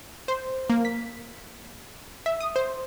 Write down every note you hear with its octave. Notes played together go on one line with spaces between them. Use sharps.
C5
A#3
B6
E5
D#6
C5